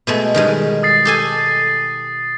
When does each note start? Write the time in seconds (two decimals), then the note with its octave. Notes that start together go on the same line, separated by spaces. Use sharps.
0.07 B2 G#3 A3
0.34 D#3 G3 G#3
0.83 D#6 A6 C7
1.05 G4 A4 G#5